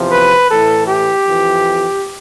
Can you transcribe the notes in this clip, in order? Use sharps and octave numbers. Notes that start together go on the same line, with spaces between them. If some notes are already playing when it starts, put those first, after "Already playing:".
Already playing: E2 C3 F3
B4
A2 E3 A4
G4
F2 E3